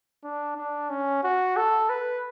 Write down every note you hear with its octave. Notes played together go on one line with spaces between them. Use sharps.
D4
D4
C#4
F#4
A4
B4